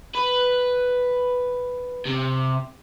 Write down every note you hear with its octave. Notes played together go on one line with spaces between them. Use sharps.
B4
C3